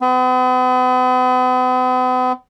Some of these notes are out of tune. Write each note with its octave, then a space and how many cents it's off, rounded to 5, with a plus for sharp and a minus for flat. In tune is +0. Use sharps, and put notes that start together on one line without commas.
B3 +45